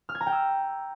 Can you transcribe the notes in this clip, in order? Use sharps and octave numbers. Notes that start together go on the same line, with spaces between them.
F6
G#6
A#5
G5
E6